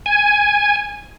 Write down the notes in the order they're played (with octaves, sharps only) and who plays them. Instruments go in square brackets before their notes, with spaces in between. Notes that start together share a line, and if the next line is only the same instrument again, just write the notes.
[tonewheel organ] G#5